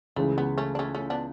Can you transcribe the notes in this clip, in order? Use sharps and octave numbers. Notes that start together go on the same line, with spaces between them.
C#2 C#3 E3 A3
B3
A3 C#4
D4
A3 C#4
A3 C#4
B3 D4